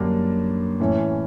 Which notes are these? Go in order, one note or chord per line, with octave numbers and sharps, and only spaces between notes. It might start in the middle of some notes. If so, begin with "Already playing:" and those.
Already playing: F#2 D3 G3 A#3 D4
A2 E3 A3 C#4